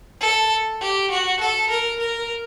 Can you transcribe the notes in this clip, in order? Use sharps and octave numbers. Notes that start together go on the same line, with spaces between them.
A4
G4
F#4
A4
A#4
A#4